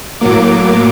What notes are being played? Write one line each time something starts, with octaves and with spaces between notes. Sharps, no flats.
A2 F#3 A#3 D6